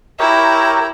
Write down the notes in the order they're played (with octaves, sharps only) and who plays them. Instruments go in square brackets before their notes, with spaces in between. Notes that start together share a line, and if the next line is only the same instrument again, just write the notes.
[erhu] E4 [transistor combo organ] G4 A#4 C#5 [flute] A#5